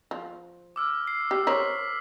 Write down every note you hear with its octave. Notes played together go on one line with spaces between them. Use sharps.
F3
D6 E6 F6
C7
G4
A#4 C5 C#5 B6 F#7